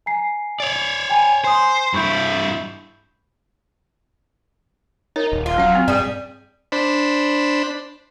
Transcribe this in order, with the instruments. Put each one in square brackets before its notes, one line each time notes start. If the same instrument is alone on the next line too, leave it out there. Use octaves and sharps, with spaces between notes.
[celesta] G#5 A#5 C7
[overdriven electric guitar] C#5 D5
[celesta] G5 G#5 B5
[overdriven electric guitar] C5 [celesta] G#5 D#6
[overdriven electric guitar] G2 E4 [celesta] B5 C#6 G6
[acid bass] D#4 [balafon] A#4 C#5
[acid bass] D#1
[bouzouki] F4
[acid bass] F#3 [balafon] C#4 F5
[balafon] C4
[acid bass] G2 [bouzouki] G3 G#4
[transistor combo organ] D4 C5 B5